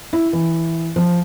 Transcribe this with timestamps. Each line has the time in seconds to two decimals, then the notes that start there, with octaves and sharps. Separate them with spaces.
0.13 E4
0.33 E3
0.96 F3